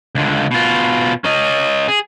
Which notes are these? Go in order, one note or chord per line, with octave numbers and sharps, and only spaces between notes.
C#2 D3
B2 F4
C#4 D#5
G#4